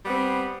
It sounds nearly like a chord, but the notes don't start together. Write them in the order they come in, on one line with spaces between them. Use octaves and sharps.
G3 B3 C4